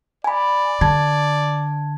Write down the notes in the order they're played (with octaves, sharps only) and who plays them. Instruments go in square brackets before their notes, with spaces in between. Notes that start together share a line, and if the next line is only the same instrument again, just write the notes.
[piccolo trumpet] D5 [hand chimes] G#5 B5
[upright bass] D3 [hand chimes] A5 G#6